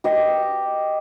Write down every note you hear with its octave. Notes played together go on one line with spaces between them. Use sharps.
G4 D#5